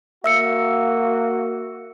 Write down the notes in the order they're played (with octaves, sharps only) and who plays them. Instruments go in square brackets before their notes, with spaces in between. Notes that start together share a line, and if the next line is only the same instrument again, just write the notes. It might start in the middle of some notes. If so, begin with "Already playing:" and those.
[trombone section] A#3 F#4 [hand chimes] E5 E6 C#7